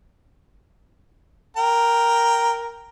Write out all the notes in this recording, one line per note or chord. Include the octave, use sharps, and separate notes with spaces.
A#4 G5 A#5